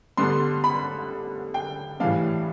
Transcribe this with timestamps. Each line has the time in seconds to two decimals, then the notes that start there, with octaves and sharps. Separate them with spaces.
0.17 D3 G3 B3 D4 C6
0.64 B5
1.54 G5
2.00 A2 E3 G3 D4 F5